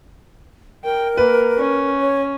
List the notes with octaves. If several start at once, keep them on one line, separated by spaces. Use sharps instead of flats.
A#4 G5
A#3 B4
C#4
C#5